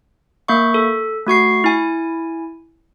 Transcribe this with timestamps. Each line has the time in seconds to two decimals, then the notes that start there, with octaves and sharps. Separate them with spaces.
0.48 A#3 E5 C#6
0.74 A4
1.27 A3 F#4 C#6 C7
1.64 E4 G#5